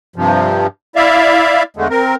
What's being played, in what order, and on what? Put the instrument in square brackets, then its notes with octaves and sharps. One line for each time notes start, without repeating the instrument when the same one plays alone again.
[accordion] G2 C3 F3
E4 D5 E5 F5
E2 D3 G#3 A3
C4 A#4